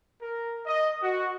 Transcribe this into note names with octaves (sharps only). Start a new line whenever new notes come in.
A#4
D#5
F#4